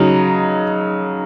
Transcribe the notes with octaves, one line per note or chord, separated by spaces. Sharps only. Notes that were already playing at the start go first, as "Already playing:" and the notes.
Already playing: C#3 F#3 D#4